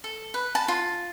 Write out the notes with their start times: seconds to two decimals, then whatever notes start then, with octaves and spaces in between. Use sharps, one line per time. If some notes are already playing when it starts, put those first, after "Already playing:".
0.04 A4
0.34 B4
0.55 A5
0.68 F4